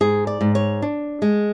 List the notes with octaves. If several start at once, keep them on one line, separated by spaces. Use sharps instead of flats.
G#2 G#4
D5
G#2
C#5
D4
G#3